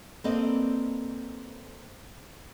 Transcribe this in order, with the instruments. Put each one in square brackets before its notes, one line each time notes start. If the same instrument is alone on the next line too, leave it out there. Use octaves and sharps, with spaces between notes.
[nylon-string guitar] A#3 C4 A4 B4 D5 D#5